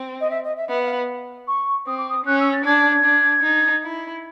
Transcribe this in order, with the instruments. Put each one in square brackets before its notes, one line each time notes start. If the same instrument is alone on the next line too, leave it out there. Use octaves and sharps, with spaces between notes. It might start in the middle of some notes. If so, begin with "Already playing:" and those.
Already playing: [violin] C4
[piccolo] D#5
E5
D#5
E5
[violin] B3 [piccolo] E5
[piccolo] F5
C#6
[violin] C4 [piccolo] D#6
[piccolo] D6
D#6
[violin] C#4 [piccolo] F#6
[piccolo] E6
A6
[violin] D4 [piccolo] G#6
[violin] D4
D#4
E4